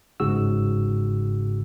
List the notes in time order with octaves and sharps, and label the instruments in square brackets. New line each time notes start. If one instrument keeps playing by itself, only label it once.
[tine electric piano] G1 G#2 C#3 F#4 G#4 E6